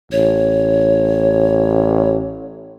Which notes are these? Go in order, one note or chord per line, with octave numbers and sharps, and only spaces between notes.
A1 C#5